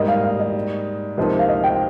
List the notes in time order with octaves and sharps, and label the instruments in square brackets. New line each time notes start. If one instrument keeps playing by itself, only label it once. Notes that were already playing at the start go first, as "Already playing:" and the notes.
Already playing: [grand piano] G#2 G3 A#3 [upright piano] D#5
[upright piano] F5
F5
D#5
[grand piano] C#2 C3 F3 A#3 D#4 [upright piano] C5
[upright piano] F5
D#5
G5